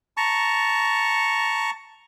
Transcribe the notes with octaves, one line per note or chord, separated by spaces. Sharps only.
A5 A#5 C#6